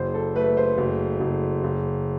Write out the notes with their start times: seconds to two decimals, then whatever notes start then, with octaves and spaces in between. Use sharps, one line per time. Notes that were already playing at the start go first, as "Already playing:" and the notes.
Already playing: F#1 C5
0.14 A4
0.36 A3 B4
0.57 C5
0.78 F#1
1.20 F#1
1.64 F#1